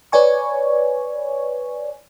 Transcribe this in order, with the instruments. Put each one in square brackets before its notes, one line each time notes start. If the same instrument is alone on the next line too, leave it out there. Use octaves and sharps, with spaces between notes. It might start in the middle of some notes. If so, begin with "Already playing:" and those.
[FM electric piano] B4 C#5 D5 G#5 C#6